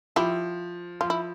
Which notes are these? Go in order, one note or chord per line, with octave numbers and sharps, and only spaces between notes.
F3 E4 G4
F3 F4
E4